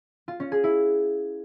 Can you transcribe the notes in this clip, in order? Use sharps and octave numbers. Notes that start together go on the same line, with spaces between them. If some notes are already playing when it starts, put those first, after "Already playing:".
F4
C#4
G#4
E4